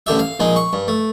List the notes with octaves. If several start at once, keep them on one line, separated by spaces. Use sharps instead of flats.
A1 D3 G4 E5
F5
A#1 G#3 D#4
C#6
G2
A3